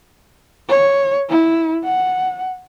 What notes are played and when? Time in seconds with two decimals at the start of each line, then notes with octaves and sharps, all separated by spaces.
0.68 C#5
1.29 E4
1.83 F#5